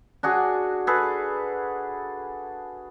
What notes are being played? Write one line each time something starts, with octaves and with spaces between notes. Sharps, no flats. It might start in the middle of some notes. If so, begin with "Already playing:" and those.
D4 F#4 G#4
G#4 A4 B4